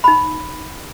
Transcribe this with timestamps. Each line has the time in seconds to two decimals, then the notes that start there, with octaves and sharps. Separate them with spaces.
0.04 D#4 B5